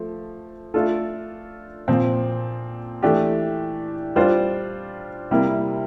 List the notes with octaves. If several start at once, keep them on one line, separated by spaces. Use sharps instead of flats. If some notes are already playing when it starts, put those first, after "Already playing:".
Already playing: F3 A3
A3 D4 F4 A4
A#2 F3 C4
E3 A3 D4 G4
G3 D4 F4 C5
C3 G3 A#3 E4